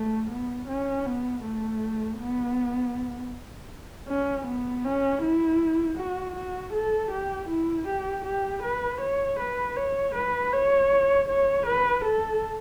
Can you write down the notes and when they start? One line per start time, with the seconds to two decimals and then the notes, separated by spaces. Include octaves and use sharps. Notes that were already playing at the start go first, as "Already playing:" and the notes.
Already playing: A3
0.30 B3
0.68 C#4
1.05 B3
1.43 A3
2.19 B3
4.08 C#4
4.46 B3
4.84 C#4
5.22 E4
5.98 F#4
6.35 F#4
6.73 A4
7.11 G4
7.49 E4
7.87 G4
8.25 G4
8.63 B4
9.01 C#5
9.39 B4
9.76 C#5
10.15 B4
10.52 C#5
11.29 C#5
11.67 B4
12.05 A4